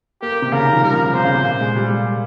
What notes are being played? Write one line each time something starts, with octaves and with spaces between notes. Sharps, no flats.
A#3 G4
A#3
C3
C#3 A#4
D#3
F3
G3 A#4
F3
C#3
C3 C5
C#3
C3
A#2
G#3
G3
G3